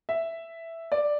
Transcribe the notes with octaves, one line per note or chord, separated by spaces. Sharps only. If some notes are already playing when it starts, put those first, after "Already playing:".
E5
D5